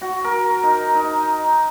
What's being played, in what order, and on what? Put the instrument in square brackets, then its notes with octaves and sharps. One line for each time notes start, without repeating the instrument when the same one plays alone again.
[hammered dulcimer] F#4
A#4
D#4
D#4